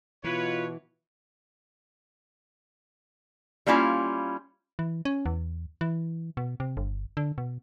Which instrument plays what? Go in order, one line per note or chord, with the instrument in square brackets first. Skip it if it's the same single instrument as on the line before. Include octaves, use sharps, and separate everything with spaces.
[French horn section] B2 [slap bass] E3 [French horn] F4 [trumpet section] B4 C#5
[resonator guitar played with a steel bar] G3 A#3 C#4 E4 F4
[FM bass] E3
C#4
E2
E3
B2
C3
G1
D3
B2